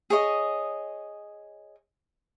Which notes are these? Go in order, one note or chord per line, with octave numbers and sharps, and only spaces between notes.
G#4 C#5 D#5